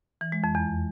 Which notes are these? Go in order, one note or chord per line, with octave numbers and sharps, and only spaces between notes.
E3
G#3
F2
E2